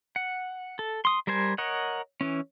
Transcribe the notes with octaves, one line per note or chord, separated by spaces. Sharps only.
F#5
A4
C6 D#6
G3 A#4 C5 G#5
A#4 C#5 D#5 F#5
E3 C#4